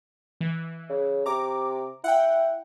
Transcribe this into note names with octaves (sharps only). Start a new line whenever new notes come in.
E3
C#3
C3 A#5 D6
E4 F#5 G5